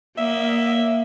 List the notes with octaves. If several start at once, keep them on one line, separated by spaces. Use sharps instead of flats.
A#3 E5